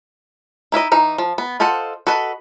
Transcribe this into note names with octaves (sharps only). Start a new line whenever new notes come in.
D#4 E4 F#4 D#5
E3 D#4 A#5
F3
B3
F4 A4 C5 D#5 F#5
F#4 A4 B4 D#5